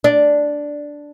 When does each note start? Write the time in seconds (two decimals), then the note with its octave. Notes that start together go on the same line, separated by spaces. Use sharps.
0.04 D4